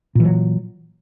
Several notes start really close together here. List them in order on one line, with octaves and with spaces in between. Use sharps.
A#2 E3 F#3